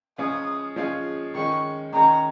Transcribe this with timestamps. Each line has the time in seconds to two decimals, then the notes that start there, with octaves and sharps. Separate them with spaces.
0.18 F3 G#3 C#4 F4 G#4 D#6
0.76 F3 G#3 C#4 F4 G#4
1.35 D#3 G#3 C#4 C#6
1.93 D#3 G#3 C#4 A#5